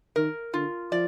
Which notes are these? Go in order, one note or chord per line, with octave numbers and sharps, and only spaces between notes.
D#3 A#4
D3 F4
F3 D5